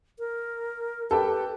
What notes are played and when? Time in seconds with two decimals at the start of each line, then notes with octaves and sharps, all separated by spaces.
0.19 A#4
1.11 G4 A4 B4 G5